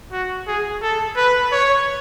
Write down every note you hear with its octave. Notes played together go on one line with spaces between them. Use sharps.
F#4
G#4
A4
B4
C#5